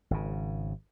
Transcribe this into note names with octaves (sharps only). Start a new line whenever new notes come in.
G#1 C#3